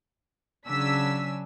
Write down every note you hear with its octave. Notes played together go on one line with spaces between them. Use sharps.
C#3 F#3 D4 G#5 E6 B6